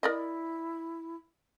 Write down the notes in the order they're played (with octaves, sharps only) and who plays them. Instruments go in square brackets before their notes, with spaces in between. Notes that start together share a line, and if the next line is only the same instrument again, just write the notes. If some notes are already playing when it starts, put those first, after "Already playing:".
[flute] E4 [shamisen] A#4 D5 D#5